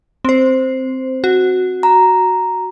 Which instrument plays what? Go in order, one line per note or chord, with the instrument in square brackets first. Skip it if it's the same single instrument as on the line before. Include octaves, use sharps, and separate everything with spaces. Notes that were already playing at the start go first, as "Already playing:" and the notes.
[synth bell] C4 C5
F#4
[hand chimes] A#5